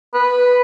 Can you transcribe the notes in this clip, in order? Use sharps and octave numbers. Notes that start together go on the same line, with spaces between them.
B4